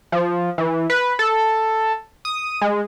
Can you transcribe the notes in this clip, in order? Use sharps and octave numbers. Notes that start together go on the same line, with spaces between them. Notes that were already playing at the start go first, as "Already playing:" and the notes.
F3
E3
B4
A4
D#6
G#3